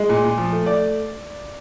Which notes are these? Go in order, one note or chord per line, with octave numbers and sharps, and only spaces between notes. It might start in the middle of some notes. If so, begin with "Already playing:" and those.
Already playing: G#3
A#2
A#2
F3
A3
A3 D5